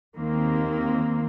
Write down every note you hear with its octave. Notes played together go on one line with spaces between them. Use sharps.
D#2 D#3 A#3 C4